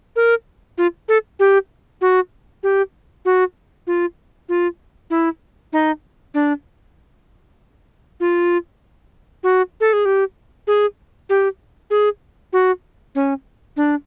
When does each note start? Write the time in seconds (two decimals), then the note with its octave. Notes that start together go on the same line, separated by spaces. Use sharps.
0.16 A#4
0.78 F4
1.08 A4
1.39 G4
2.01 F#4
2.63 G4
3.25 F#4
3.87 F4
4.49 F4
5.10 E4
5.73 D#4
6.34 D4
8.20 F4
9.43 F#4
9.80 A4
9.93 G#4
10.05 G4
10.67 G#4
11.29 G4
11.90 G#4
12.53 F#4
13.15 C#4
13.77 D4